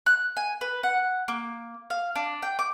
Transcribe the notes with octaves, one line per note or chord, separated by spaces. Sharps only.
F#6
G#5
B4
F#5
A#3
F5
D4
G5
D6